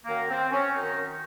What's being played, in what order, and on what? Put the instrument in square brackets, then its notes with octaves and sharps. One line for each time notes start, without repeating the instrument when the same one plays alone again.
[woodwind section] F#2 D#3 A#3
C4
C#4
F#2 D#3 D#4